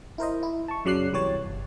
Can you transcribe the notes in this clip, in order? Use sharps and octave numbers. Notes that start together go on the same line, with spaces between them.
E4 A#4 C5 D#5
E4
A5 C#6
F#2 C#3 F#3 D5 F#6 C7
C2 E3 G4 C#5 A6
G1